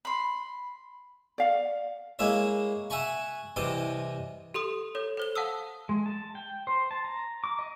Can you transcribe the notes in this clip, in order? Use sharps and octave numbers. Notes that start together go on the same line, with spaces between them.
B5 C6
D5 F5 F#5
G#3 A#3 E4 C#5 E5
E5 F#5 G#5 B5 C#6
C2 C3 E3 D#5 D6
G4 A4 C6 D#6
A4 C#5
A4 C5 G7
F5 F#5 A5 D#6 E6
G#3
A5
G5
C5
A5
A#5
D6
D#5